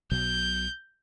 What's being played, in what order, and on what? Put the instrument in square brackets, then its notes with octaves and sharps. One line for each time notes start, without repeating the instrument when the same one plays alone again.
[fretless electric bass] B1 B2 F#3 [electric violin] G6